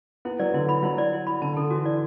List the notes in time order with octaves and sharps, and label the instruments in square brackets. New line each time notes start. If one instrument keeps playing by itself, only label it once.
[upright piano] B3 [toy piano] E4
[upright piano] F#3 [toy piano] D5
[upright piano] D3 [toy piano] E4
[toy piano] B5
[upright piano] F#3 [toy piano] E4
[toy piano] D5
E4
B5
[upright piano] D3 [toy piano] A5
[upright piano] D3 [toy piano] A4
[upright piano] E3 [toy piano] F#4
[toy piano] D5